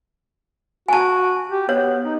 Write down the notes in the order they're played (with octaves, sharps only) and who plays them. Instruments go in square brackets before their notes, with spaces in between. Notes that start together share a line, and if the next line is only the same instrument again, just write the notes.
[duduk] F#4 [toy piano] G#5 A5
[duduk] G4
[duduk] B3 [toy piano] C#5
[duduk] D#4